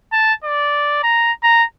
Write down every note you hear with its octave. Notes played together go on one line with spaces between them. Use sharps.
A5
D5
A#5
A#5